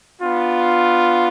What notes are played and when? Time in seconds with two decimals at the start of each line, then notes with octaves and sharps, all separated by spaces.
0.21 B3 D4 F4